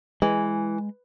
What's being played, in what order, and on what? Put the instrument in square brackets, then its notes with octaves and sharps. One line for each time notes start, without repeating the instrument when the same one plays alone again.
[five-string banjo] E3 [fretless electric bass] G#3